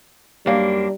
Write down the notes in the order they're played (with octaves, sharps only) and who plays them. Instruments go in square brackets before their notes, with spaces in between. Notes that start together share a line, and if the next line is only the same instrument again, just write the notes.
[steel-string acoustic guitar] F#2 A#3 D4 [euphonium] G3